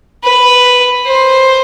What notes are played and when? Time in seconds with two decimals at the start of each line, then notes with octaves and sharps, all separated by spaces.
0.24 B4
1.06 C5